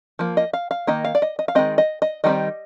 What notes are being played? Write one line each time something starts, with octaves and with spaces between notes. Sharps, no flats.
F3 A#3
D#5
F5
F5
D#3 A#3 D#4 D#5
F5
D5
D#5
D#5
F5
D#3 G#3 C4 D#5
D#5
D#5
D#3 G3 C4 D#4 D#5